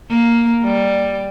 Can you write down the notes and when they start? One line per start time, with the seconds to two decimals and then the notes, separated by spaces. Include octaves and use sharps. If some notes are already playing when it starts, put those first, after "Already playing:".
0.10 A#3
0.64 G3